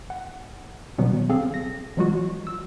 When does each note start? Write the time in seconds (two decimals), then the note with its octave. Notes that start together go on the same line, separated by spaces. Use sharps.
0.10 F#5
0.98 B2 D#3 F#3 G3 B3
1.30 C4 G#4 A4 F5
1.54 A#6
1.97 E3 F#3 G#3 F4 F#4
2.47 E6